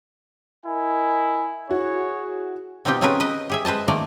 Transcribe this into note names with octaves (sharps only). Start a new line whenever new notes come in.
E4 A#4 D#5 G#5
E4 F#4 G#4 C#5
B2 C4 D#4 F4 G4 G5
C4 C#4 F4 G#4 A#4 B4
B4 D#5
G4 G#4 E5
G#3 B4 C5 D#5 A5
D#3 F3 A3 A#3 D5 A#5